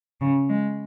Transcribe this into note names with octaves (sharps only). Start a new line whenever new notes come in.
C#3
G#3